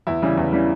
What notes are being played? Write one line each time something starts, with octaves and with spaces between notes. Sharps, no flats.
E2 E4
C#3 E3 G3
E2
C#3 E3 G3